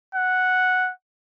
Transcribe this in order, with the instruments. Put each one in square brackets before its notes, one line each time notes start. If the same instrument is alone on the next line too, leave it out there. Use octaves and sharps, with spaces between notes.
[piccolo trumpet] F#5